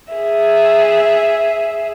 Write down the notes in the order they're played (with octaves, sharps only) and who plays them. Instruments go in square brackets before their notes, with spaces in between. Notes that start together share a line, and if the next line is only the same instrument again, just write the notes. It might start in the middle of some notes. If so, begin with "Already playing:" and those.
[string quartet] G#4 E5